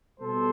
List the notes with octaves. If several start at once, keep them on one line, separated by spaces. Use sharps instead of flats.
B2 G3 A4 C5